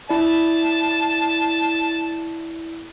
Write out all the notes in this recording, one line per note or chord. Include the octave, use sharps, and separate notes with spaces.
E4 D5 A5